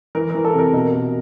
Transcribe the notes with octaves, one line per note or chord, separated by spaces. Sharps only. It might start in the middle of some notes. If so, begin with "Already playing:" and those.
E3 A#4
E3 A#4
A4
C3 A#4
B2 A#4
B2